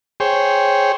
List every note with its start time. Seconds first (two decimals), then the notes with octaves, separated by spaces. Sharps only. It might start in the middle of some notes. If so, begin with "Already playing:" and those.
0.20 G#4 C5 C#5 G5